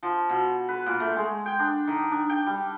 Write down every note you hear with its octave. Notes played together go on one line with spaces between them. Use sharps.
F3
B2
B4
A#2
A3
G#3
G5
D4
D#3
D4
G5
G3